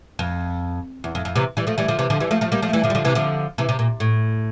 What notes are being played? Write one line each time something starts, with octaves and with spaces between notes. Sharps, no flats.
F2
E2
F2
F2
C3 E3
E3 G3
F3 A3
E3 G3
D3 F3
C3 E3
D3 F3
E3 G3
F3 A3
F3 A3
G3 A#3
F3 A3
E3 G3
D3 F3
G3
D3 F3
C3 E3
D3 F3
C3 E3
C3
A#2
A2